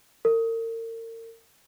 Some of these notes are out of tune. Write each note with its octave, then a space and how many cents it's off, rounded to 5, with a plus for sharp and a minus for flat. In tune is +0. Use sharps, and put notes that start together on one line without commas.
A#4 -40